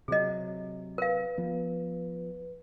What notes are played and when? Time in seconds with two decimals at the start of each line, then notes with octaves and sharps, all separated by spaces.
0.08 C3 F#3 G#4 D#5
0.98 A#4 B4 F5
1.38 F3 B3